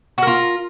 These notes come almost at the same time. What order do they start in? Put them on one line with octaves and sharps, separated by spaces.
F#4 A#4 F4